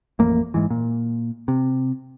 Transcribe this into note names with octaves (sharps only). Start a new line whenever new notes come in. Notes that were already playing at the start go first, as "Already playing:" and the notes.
A1 F2 A#3
G#2 E3
A#2
C3